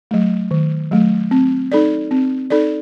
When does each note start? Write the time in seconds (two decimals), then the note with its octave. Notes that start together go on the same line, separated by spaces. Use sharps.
0.11 F#3 A3
0.51 D#3
0.91 F#3 A3
1.31 C4
1.72 D#4 A4 D5
2.11 C4
2.50 D#4 A4 D5